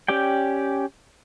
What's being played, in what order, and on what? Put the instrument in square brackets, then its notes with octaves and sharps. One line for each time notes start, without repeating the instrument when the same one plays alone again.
[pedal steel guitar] C#4 G4 D5 G5